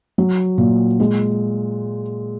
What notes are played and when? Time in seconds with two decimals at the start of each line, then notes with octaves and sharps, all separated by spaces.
0.18 F#3
0.58 A#2
1.00 G#3